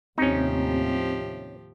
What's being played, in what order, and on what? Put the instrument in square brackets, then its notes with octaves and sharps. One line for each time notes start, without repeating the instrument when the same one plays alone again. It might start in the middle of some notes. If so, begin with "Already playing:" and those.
[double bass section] D#2 A2 C3 [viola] F3 G4 [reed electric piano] C4 [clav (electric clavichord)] C#4 D#4